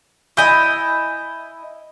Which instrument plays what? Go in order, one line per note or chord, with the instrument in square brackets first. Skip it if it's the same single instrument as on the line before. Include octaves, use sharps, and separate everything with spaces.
[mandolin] E4 D#5 [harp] G#5 G6